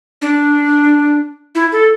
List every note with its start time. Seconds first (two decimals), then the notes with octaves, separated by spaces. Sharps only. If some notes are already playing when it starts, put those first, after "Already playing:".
0.22 D4
1.55 E4
1.72 A4